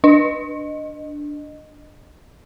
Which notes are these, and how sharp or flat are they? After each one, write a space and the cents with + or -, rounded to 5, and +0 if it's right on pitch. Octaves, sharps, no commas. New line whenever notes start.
D4 +0 D#5 -15